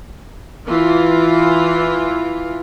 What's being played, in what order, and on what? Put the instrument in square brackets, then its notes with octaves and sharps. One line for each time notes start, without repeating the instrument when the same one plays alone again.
[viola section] E3 F4